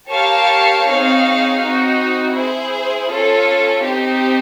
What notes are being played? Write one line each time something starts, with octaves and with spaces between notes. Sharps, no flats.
G4 A#4 C#5 F5 A5
C4 D#4 G#4 C#5 F5
C4 D#4 F#4
E4 G#4 C5
C#4 F4 A4
C4 D#4 G4